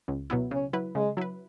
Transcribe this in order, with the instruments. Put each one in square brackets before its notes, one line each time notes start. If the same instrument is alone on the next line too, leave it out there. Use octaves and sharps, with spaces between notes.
[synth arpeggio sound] C#2
B2 F#3 B3 E4
[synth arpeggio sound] C#3 [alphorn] C#4
[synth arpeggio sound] F#3 E4 B4
[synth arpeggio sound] C#3 [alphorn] G#3
[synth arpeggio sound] F#3 E4 B4